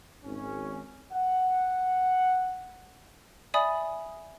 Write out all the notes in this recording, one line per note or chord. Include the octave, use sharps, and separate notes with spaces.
G#1 C#4
F#5
D5 E5 G#5 B5 D#6